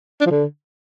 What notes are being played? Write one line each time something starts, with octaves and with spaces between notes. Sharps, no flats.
D4
F3
D3